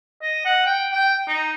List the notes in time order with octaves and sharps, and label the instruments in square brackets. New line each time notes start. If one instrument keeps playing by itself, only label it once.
[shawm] D#5
F#5
G5
G5
D#4